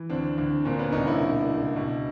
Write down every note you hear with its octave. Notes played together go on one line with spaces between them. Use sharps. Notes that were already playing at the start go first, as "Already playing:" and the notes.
Already playing: E3
D2 C4 D4
D2
A#2 C4 D4
B3 C#4
C2 C#4 D#4
D4 E4
B2
C#2
B2